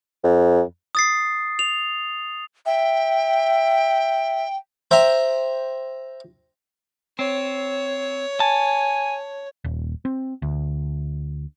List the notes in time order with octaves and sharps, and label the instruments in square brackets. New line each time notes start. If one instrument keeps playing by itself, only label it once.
[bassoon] F2
[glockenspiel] D#6 A6 C7
F7
[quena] E5 [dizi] G5
[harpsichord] C5 E5 G5 A#5
[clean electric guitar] C4 [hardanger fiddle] C#5
[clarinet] G#5 [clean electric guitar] A5
[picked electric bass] D#1
C4
D2